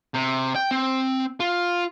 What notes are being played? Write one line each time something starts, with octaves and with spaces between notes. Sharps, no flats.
C3
G5
C4
F4